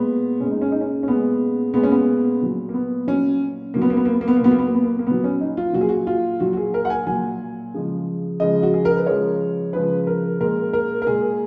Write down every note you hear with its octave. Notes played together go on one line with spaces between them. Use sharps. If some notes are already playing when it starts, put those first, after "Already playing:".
Already playing: A#2 G#3 B3
A#2 G#3 C#4
D#4
C#4
D#4
C#4
C#4
A#2 G#3 B3
A#2 G#3 B3
C#4
B3
A#2 F#3
A#3
B3
A#2 F#3 C#4
A#2 F#3 A#3
B3
A#3
B3
A#3
B3
A#3
B3
A#3
A#2 F#3 B3
A#3
B3
A#3
B3
A#3
A#3
A#2 F#3 B3
C#4
D#4
F4
A#2 F#3 F#4
G#4
F#4
F4
A#2 F#3 F#4
F#4
G#4
A#4
F#5
G#5
A#2 F#3 G#5
C#3 F3 G#3
C#3 F3 G#3 D#5
F#4
G#4
A#4
B4
C#3 F3 G#3 C#5
C#3 F3 G#3 B4
A#4
A#2 G#3 A#4
A#4
A#4
A#2 G#3 G#4